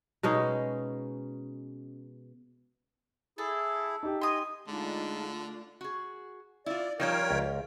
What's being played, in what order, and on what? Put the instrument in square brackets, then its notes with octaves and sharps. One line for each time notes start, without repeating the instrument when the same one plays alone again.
[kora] B2 G#3 C#4 D#4
[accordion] E4 G#4 [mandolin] A4
[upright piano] D#4 G4
[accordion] D#5 G#5 [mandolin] C6 D#6
[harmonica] D3 [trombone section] G#3 [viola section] A3 D4 F4 [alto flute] D#4
[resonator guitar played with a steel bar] F#4 G#4
[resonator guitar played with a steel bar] E4 F4 [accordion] D5
[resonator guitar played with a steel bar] F3 G3 F4 [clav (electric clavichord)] D#4 [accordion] A#4 C#5 G5
[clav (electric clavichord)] C#2